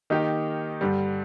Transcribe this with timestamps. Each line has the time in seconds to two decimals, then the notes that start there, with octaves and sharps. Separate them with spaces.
0.10 D#3 A#3 D#4 G4
0.81 G2 D3 G3